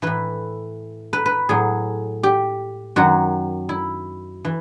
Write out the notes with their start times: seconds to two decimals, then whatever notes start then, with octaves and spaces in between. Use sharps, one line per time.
0.02 A2 E3 B4
1.13 B4
1.26 B4
1.49 A2 F#3 G#4
2.23 G4
2.96 F#2 D#3 F#3 F#4
3.69 E4
4.45 E3